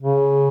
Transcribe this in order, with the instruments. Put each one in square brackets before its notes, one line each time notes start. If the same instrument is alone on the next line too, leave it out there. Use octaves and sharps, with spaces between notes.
[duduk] C#3